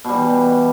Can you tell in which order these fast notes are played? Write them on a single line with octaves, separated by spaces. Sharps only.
B2 G3 E3